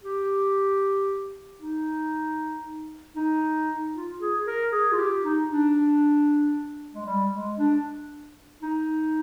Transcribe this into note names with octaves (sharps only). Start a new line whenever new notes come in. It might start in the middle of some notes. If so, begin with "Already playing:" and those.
G4
D#4
D#4
F4
G#4
A#4
G#4
F4
G4
D#4
D4
G#3
G3
G#3
D4
D#4